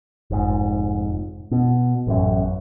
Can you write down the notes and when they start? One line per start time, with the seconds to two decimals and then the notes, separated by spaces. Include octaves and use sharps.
0.31 F1 G#2
1.51 B2
2.07 A1 F#2